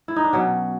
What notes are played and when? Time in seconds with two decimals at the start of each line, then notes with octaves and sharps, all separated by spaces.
0.08 E4
0.16 D#4
0.24 D4
0.33 B2 F#3 C#4